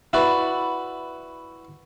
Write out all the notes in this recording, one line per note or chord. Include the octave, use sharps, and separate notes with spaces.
E4 F#4 B4 D5